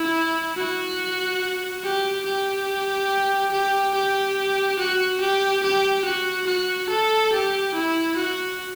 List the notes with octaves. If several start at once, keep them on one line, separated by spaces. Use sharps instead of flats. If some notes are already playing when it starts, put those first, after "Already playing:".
Already playing: E4
F#4
G4
G4
G4
G4
F#4
G4
G4
F#4
F#4
A4
G4
E4
F#4